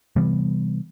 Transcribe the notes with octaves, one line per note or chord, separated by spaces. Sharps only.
C3 E3 G3 B3